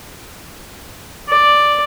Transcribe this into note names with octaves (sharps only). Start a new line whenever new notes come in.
D5